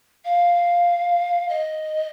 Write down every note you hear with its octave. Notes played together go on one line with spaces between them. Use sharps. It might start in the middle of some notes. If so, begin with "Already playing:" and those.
F5
D#5